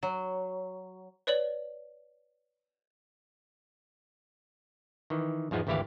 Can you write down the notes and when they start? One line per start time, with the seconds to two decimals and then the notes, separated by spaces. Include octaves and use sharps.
0.03 F#3
1.27 B4 C#5 D5 F#7
5.10 D#3 E3
5.51 E2 G#2 F3 G#3 B3
5.67 G#1 D2 E3 E4 G4 F5